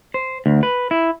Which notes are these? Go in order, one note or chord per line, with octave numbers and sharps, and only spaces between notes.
C5
D2
B4
E4